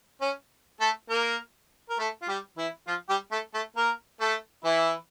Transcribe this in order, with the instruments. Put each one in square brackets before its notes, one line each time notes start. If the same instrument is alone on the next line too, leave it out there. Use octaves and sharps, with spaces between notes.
[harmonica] C#4
A3 A4
A#3 A#4
A#4
A3 A4
F4
G3 G4
E3 E4
F3 F4
G3 G4
A3 A4
A3 A4
A#3 A#4
A3 A4
E3 E4